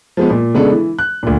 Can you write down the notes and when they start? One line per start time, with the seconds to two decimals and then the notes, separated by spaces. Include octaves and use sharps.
0.17 F3 G#3 B3
0.30 A#2
0.54 C#3 G#3 B3 D4 A4
0.72 E3
0.99 F#6
1.23 D2 A#2